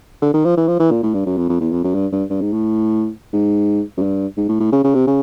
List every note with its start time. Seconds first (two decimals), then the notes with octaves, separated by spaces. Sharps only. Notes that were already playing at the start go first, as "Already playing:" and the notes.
0.22 D3
0.34 D#3
0.45 F3
0.57 E3
0.68 F3
0.80 E3
0.91 A#2
1.03 A2
1.14 G2
1.26 F#2
1.37 F2
1.49 F2
1.61 E2
1.72 F2
1.84 F#2
1.95 G2
2.12 G2
2.30 G2
2.41 G#2
2.53 A2
3.33 G#2
3.98 F#2
4.03 G2
4.37 G#2
4.49 A2
4.60 A2
4.72 C#3
4.84 C#3
4.95 C3
5.07 C#3